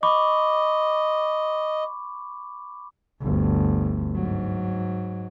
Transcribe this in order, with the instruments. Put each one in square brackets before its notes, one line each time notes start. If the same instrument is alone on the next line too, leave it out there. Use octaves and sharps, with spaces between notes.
[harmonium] D#5 [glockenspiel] B5 C#6 D6
[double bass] G1 D2
G#2 F#3